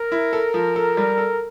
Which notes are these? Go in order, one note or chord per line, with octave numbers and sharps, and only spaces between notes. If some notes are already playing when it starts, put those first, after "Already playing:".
Already playing: A#4
E4
A4
F3
A4
G3
A4